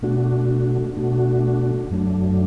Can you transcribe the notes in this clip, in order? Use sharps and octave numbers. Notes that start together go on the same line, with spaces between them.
B2 A3 D4 F#4
B2 A3 D4 F#4
F#2 F#3 A3 D4